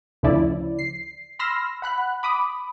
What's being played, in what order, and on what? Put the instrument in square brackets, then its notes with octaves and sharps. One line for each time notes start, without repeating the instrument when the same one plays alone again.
[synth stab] D2 C#3 F3 E4 D5
C7
B5 C6 E6 F6 A#6
F#5 B5 F#6
B5 D6 D#6